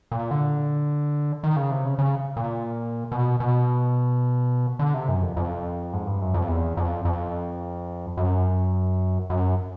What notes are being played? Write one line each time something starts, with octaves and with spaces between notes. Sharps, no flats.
A#2
D3
D#3
C#3
C3
C#3
C#3
A#2
B2
B2
D3
C3
F#2
F2
F2
G#2
G2
F#2
F2
E2
F2
F2
F#2
F#2